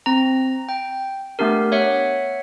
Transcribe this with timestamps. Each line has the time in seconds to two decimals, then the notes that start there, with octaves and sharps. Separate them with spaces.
0.06 C4 A#5
0.69 G5
1.39 A3 B3 D4 G4 A#4
1.72 C#5 E5 F#5